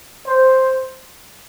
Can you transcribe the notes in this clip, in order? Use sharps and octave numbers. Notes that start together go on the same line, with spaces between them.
C5